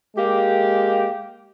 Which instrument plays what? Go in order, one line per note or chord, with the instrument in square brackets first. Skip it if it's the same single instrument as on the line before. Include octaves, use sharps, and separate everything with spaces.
[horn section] G#3 A#3 G4